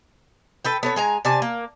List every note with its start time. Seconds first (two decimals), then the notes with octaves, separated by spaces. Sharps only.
0.65 A4 B4 G5
0.83 B3 A4 C#5
0.96 G#3 G#5 A#5
1.25 C3 D4 G#5 A5
1.42 A#3